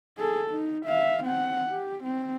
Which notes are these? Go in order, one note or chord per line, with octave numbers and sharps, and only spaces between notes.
G#4 A4
D#4
E5 F5
C4 F#5
G4
C4